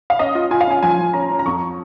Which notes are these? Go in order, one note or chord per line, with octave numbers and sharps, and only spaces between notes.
F5
C#4 D#5
F4
F4 G#5
F5
C#4 G#5
F3 G#5
F3
C#4 A#5
C#4
A#5
F2 C#6